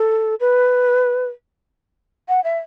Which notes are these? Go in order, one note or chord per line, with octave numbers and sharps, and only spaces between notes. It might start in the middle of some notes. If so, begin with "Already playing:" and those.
Already playing: A4
B4
F#5
E5